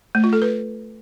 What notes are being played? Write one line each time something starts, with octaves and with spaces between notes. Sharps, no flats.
A3
F4
A4
B4